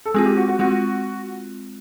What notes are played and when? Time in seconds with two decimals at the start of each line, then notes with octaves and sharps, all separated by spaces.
0.06 A4
0.14 G#3 C4 F4 G#4
0.26 G4
0.37 F#4
0.48 F#4
0.59 G#3 C4 F4 F#4